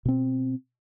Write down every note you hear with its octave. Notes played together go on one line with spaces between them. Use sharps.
B2 C4